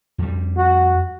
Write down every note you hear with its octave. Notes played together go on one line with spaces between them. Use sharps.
F2 G3
F#4